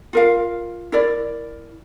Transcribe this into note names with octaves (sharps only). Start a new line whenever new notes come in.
F4 A#4 F5
E4 A#4 D5